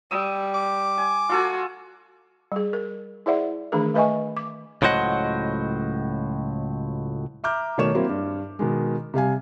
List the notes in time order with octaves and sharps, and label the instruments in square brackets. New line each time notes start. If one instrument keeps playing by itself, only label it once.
[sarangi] G3 [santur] D#6 E6
[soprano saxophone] D6
[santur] G#5
[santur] F4 A4 G#5 [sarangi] F#4
[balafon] G3 G#4
A#4
E4 G#4 C5 D5 E5 F#5
D#3 E3 A3 D4 G#4 A#4
A3 B4 D#5 E5 G#5 C#6
D6
[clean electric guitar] C#2 A2 F#3 C5 D#5 F#5
[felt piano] E5 A#5 D6 F6 G6
B2 D#3 A3 C#5 C#6 E7
F#3 A#3 C4 E4
G2
B2 D#3 G#3
C3 G3 F5 G#5